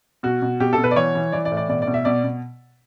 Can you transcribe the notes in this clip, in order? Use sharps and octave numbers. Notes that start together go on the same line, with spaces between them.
B2 F#4
B2
B2 G4
A4
B2
B4
D5
E3 C#5
E3
E3 D5
D5
A2
D5
B2 D5
D5
B2
E5
B2 D5
B2